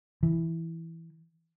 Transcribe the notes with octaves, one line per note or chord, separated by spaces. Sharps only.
E3